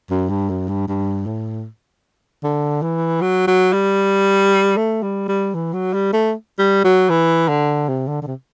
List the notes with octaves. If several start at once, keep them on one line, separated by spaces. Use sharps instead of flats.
F#2
G2
F#2
G2
G2
A2
D3
E3
F#3
F#3
G3
A3
G3
G3
E3
F#3
G3
A3
G3
F#3
E3
D3
C3
D3
D3
C3